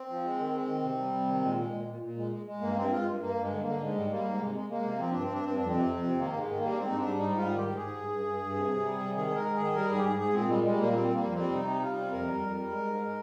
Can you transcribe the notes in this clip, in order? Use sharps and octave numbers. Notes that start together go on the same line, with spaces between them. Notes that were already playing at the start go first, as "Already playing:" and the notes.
Already playing: C4
F3
G#3
D#3
G#3
D#3
C3
G3
C3
D#3
A#2 G#3
G#3
A#2
A#2
A#2
G#3
G#3
G#3
G2 A#3
G2 C4
G#3 F4
G2
G2 A#3
G2 G#3
D3
D3 A#3
G#2 G#3
G3
G3 A#3
G#2
C3 G#3
G#3
G#3 A#3
C3
F3 C4
G2 D4
C4
G2 D4
G2 C4
F2 D4
C4
C3
F2
C3
D#3 A#3
G#2 G#3
D#3
G3 A#3
D4
G#2 C4
D#4
G#2 D4
G3
D#4
G#2
G3 F4
D#3 G4
G#2
G#4
G#2
G2
G2
G2
G2
C3
C3
G3
C3
D#3 G#4
G#3 A#4
G#2
G#4
D#3
G3 A#4
G#2 G#4
G4
G#2 G#4
G#2 G#4
A#2 C4
G3 G#3
G3 G#3
A#2 A#3
G3 C4
G3 A#3
F2
C4
G3
C3 D#4
G3
G3 F4
C3
F2 A#4
G3
F2
G3
G#3
G#2
G#3